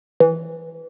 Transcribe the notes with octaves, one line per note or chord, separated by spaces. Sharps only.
E3